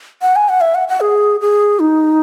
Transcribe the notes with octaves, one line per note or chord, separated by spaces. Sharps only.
F#5
G#5
F#5
E5
F#5
F#5
G#4
G#4
D#4